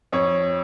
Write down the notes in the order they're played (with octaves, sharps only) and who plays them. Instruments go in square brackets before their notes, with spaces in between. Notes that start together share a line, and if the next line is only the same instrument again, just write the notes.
[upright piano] F2 C#5